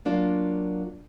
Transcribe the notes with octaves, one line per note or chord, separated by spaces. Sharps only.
F#3 A#3 D4 F4